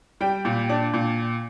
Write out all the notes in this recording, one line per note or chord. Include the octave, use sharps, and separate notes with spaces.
G3 G5
A#2
D4
A#2